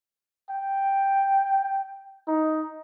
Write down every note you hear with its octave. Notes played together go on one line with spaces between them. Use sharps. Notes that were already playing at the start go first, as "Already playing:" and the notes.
G5
D#4